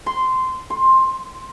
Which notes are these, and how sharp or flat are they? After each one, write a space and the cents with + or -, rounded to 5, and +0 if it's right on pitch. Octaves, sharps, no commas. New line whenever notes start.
C6 -15
C6 +10